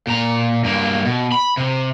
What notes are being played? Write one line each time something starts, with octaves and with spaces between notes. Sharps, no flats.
A#2 A#5
G2 A#3
B2
B5
C3